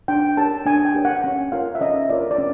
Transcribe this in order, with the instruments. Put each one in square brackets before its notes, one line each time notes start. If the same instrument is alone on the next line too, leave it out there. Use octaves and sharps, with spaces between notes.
[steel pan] D4 G5
G4 A#4 C#5 A5
D4 G#5
G5
G4 A#4 C#5
F#5
C#4
F4 A#4 C#5 F5
E5
C#4 D#5
F4 A#4 C#5 D5
D5
C#4